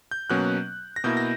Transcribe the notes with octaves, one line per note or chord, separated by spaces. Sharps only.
G6
B2 F#3 A#3 C#4 F#6
A#6
B2 A#3 E4 G6
A#6